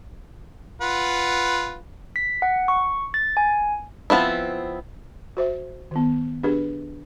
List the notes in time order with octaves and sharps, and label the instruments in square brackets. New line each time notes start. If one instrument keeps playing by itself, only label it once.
[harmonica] F4 B4 F#5
[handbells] B6
F#5
C#6
A6
G#5
[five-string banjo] F3 B3 C4 E4
[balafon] F#4 C5 E5
D#3 B3
D4 G4 G#4 B4